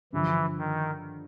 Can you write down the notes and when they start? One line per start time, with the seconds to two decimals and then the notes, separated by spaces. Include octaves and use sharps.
0.13 G2 D3 E3 F3
0.58 D#3